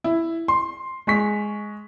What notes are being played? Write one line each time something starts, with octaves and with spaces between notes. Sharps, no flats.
E4
C6
G#3 C#6 B6